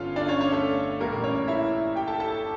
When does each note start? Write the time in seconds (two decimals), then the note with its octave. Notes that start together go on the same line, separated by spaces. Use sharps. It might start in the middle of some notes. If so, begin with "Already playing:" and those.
Already playing: G1 G2 C#4 F4 A4 F5
0.16 D4 D5
0.28 C#4 C#5
0.41 C#4 C#5
0.52 A3 A4
1.00 A#1 A2 E3 G3 A#3 A#4
1.24 C#4 C#5
1.48 E4 E5
1.95 G4 G5
2.08 A4 A5
2.20 A4 A5